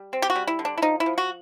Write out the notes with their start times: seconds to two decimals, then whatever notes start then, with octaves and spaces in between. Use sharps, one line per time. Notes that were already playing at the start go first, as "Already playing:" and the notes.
Already playing: G3
0.13 C4
0.22 G4
0.30 F#4
0.36 G3
0.47 E4
0.59 D3
0.65 D4
0.78 E4
0.82 F3 D#4
1.00 E4
1.06 F3
1.18 F#4